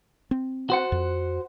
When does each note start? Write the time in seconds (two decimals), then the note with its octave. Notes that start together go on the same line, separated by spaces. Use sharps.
0.31 C4
0.70 F#4 C5 F#5
0.92 F2